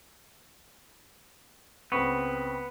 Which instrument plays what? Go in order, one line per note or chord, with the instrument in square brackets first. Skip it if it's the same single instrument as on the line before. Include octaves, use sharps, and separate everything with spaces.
[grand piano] C#2 C4 C#6 [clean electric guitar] B3